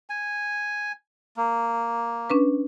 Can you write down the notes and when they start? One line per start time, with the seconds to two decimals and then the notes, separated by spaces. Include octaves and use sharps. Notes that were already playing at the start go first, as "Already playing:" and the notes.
0.10 G#5
1.37 A#3
2.30 C#4 D4 B4